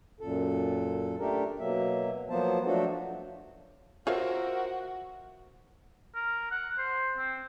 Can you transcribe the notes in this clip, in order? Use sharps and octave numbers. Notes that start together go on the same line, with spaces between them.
F#2 A#2 A4
A3 D4 G4 A4 A#4
B2 F#3 A#3 E5
F3 F#3 A#3 B3 C5 A5
F3 F#3 A3 D4 F#4 A4
F4 F#4 A#4 C5 C#5 E5 F5
A#4
F#5
C5
C4